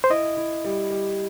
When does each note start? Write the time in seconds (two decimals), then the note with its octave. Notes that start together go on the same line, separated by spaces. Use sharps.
0.04 C5
0.10 E4 D#5
0.37 E4
0.64 G3
0.90 G3